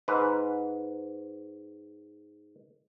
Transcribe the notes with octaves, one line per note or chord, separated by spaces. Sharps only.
G#2 B4